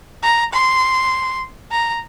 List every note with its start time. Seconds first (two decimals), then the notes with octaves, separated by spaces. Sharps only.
0.23 A#5
0.52 C6
1.71 A#5